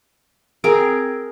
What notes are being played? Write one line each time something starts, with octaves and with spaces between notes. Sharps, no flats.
C4 G#4 A#4 G5